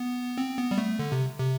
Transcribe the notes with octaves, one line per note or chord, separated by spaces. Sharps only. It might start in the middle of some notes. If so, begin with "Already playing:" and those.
Already playing: B3
C4
B3
G3
A3
D3
C3
C3